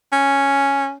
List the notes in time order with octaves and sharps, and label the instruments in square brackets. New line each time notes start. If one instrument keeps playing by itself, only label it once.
[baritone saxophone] C#4